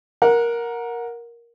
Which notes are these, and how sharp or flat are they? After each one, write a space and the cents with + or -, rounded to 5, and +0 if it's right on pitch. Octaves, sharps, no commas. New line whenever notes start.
A#4 +10 F#5 -15